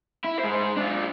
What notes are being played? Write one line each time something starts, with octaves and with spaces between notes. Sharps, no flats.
E4
G#3 C5
D4 F4